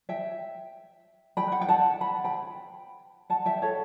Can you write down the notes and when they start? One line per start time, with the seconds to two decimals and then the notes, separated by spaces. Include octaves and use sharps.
0.09 E5 G5
1.37 G5 B5
1.52 F#5
1.61 G5
1.68 F#5 A5
2.01 B5
2.24 G5 B5
3.30 F#5 A5
3.46 E5 G5
3.62 A4 C#5